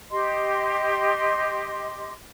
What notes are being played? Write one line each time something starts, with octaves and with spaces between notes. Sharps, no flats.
G4 D#5 C6